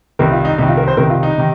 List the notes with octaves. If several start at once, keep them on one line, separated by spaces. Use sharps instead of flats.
C2 C3 D#3 A#4
F4
D#4
C2 C3 D#3 D#4
F4
A#4
C5
C2 C3 D#3 A#4
F4
D#4
C3 D#3